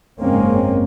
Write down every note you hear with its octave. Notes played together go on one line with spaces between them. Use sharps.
F#1 G#2 G#3 A#3 C4 C#4